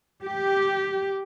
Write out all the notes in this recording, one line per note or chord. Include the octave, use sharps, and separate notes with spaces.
G4